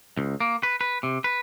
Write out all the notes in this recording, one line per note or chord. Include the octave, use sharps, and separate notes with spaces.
C#2
A#3
B4
B4
C3
B4